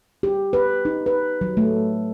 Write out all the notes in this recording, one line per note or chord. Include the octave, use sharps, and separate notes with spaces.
G4
B4
D#4
B4
F#3
A3